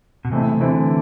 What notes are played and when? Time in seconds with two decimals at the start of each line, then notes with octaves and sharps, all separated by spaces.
0.25 B2
0.31 C3 E3 A3 C4 E4
0.60 D3 E3 A3 C4 E4